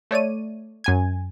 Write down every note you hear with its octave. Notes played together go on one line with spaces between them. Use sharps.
A3 C#5 D5 D#7
F#2 G#5 G#6